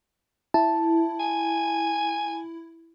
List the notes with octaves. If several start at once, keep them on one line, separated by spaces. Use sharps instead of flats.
E4 A5
G#5